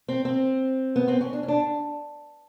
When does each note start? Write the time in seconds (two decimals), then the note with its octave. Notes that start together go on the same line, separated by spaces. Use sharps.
0.08 C4
0.25 C4
0.96 B3
1.08 C4
1.21 C#4
1.33 D4
1.43 C#4
1.48 D4